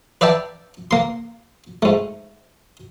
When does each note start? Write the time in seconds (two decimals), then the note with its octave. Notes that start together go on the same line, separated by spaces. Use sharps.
0.21 B4 D5 E5 G5 A5
0.91 A#3 C6
1.82 G#2 A3